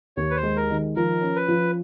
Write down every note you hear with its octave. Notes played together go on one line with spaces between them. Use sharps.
D#2 C#5
B4
C5
G#3
A#4
D#3
F3 A#4
C#4
B4
F3